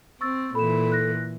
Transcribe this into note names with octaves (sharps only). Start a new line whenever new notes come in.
C4 C#6 E6 A6
A#2 E3 A4 B5 E7
F#6 A#6